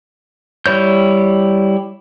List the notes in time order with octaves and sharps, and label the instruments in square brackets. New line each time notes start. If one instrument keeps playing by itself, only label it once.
[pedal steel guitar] G3 E4 C#5 G6